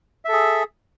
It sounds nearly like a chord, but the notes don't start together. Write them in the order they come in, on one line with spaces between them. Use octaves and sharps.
E5 A4 G#4